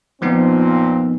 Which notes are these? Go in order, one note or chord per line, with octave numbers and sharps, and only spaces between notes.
F2 A#2 F3 B3 C4 D#4